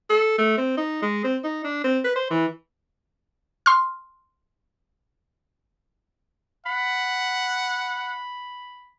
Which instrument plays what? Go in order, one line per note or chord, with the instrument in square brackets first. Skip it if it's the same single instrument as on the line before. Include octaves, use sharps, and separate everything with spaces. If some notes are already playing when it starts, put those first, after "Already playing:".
[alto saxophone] A4
A3
C4
D#4
G#3
C4
D#4
D4
C4
B4
C5
E3
[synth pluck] C6 F6
[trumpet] F#5 [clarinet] B5